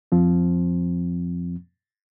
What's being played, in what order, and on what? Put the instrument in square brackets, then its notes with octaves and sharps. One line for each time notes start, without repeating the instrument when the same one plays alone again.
[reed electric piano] F2 F3 C4